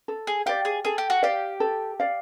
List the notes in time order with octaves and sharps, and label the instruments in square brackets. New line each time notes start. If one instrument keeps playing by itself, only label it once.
[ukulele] A4
[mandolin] G#4
[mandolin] G4 [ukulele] D5 F5
[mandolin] G#4
[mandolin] G#4 [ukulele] A4
[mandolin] G4
F#4
[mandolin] G4 [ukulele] D5 F5
[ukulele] A4
D5 F5